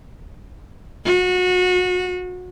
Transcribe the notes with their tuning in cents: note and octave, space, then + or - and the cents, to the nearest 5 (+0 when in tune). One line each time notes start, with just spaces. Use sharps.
F#4 -30